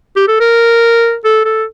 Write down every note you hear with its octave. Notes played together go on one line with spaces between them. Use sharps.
G4
A4
A#4
A4
A4